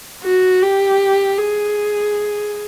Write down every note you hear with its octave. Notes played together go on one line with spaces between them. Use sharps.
F#4
G4
G#4